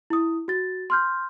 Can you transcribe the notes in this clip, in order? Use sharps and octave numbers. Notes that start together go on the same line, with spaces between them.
E4 D#6
F#4 A6
C6 F6 G6